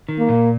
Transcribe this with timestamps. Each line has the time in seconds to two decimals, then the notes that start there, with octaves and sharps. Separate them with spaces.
0.09 D#3
0.19 A#3
0.29 A#2